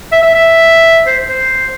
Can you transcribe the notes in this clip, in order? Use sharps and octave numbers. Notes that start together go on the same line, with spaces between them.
E5
E5
E5
C5
C5